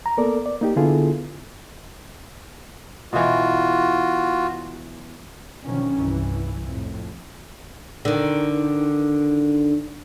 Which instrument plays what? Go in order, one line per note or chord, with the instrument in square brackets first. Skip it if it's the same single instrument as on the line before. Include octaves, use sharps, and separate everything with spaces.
[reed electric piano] A#5
A#3 B3 A4 A#4 D5
D5
A#3 D#4 G4
D3 B3 E4 F4 G#4 A4
[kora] B2 E3 [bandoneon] F4 F#4
[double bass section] B2 D3 D#3 F3 F#3 C#4
C2 G2 E3
F2 A2
[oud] D3 D#3